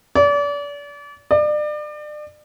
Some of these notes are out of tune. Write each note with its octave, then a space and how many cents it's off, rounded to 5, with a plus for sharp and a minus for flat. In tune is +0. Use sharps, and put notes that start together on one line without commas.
D5 -35
D5 +35